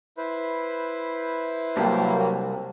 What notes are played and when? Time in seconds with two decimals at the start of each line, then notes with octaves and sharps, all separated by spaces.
0.17 E4 B4 C5
1.77 C2 G2 F#3 A#3 G5 A5